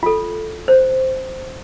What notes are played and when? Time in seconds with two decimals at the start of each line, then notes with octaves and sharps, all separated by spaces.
0.03 F4 A4
0.68 C5